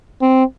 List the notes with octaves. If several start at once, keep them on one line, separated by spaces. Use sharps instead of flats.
C4